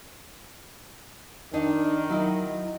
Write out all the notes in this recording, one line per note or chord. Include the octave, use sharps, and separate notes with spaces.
D#3 D4 D#4
F#3 E4 D#5